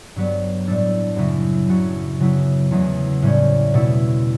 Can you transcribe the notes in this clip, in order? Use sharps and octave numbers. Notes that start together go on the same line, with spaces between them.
G2 F#3 B3
A2 G3 D4 A4
F#2 C#3 F#3 A3 E4
C#3 F#3 A3 C#4 F#4
C#3 F#3 B3 E4
E2 C#3 F#3 A3
A2 G3 C#4
B2 A3 E4